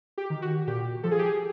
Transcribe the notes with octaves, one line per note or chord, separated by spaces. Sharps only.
G4
D#3
F#4
A#2 G4
F3 A4
G#4
G4
G#4